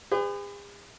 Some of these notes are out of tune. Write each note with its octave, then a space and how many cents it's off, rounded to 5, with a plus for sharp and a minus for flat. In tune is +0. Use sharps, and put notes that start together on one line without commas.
G#4 -45 B4 +40